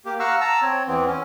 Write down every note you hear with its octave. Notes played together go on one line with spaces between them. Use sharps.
A#3 G4
F5 F#5 A#5 C#6 E6 F6
A5 A#5 E6
C4 C#5
E2 E3 B3 C4
C#4